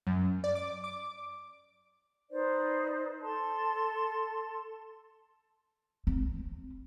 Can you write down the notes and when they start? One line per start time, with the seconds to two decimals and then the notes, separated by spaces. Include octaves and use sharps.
0.07 F#2
0.44 D5
0.55 D6
0.84 D6
2.30 D#4 B4 C5 D5
3.21 A4 A5 C6
6.07 C4